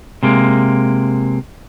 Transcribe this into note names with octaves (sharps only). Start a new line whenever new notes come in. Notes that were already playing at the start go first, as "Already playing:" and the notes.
C3 G#3 A#3